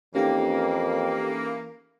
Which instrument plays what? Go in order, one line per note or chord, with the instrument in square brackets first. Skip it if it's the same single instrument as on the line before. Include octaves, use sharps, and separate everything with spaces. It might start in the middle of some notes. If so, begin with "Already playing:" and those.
[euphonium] F2 [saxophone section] E3 A#3 [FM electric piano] C#4 D#4 A4 [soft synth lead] G4